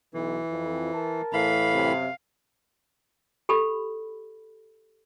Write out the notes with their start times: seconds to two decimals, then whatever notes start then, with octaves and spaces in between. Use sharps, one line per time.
0.14 B1 E3
0.50 F2
0.94 A#4 A5
1.33 A2 E3 F5 B5
1.73 F#2 C3
3.49 G4 A4 B5